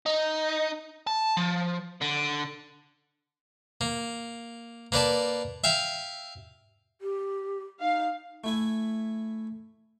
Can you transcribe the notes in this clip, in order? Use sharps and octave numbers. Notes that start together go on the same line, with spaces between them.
D#4
A5
F3
D3
A#3
A#3 B4 D5 A5
E5 F5 G5
G4
D#4 F5
A3 E4 G#5